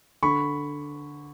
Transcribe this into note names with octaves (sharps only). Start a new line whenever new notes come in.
D3 B5 C#6